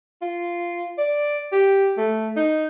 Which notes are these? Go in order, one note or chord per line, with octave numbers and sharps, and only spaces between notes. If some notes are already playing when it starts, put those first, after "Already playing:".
F4
D5
G4
A3
D#4